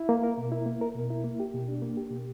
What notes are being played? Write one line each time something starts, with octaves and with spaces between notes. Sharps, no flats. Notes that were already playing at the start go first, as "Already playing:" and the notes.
Already playing: E4
A#3
A#4
B2
E4
A#3
A#4
B2
E4
A#3
G4
B2
D4
A#3
G4
B2